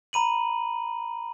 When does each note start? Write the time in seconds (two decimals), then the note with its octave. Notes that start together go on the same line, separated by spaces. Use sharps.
0.13 A#5 B5 D#7 F#7